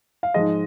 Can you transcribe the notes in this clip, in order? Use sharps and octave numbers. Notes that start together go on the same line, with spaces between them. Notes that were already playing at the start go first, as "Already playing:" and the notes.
F5
G#2 F3 G#3 D#5